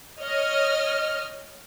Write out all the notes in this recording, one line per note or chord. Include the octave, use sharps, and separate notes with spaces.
C#5 D#5 F6